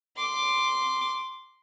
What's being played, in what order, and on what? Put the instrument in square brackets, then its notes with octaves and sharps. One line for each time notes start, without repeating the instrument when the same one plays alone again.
[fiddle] C6 D6